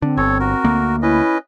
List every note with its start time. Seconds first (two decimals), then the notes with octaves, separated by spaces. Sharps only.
0.02 D3 C4
0.17 G1 A4 C#5
0.40 F#4 A#4
0.64 D2 A#3
1.02 C#4 E4 B4 D#5